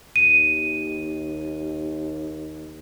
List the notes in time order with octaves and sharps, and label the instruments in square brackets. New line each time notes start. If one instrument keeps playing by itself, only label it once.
[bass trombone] D#2 [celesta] D#7